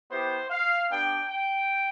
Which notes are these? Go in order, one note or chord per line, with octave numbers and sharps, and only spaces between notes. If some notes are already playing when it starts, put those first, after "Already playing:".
B3 E4 G4 C5
F5
B3 D4 G4 G5
G5